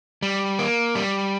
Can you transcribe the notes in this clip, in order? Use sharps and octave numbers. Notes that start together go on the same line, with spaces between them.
G3
A#3
G3